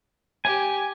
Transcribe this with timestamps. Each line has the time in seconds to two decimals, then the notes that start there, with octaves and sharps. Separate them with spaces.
0.45 G4 G#5